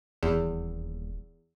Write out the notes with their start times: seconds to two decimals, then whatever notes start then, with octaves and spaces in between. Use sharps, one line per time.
0.23 D#1 E2